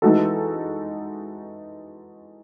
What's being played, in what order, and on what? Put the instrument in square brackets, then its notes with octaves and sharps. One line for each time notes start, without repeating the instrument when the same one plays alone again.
[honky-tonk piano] E3 G#3 D#4 F#4 A4